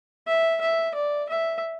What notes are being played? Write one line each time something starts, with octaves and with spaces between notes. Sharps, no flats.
E5
E5
D5
E5